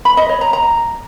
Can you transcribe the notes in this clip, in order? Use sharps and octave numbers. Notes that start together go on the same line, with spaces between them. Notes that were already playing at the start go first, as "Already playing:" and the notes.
B5
D#5
C#5
A#5
A#5